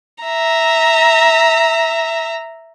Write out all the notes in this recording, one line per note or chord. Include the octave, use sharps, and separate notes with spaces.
E5 A#5